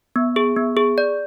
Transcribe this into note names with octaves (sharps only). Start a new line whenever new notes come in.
B3
G#4
B3
G#4
D5